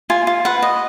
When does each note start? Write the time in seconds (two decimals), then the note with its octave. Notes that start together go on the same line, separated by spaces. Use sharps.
0.10 F4 G#5
0.27 F4
0.45 B4 F#5
0.62 D#5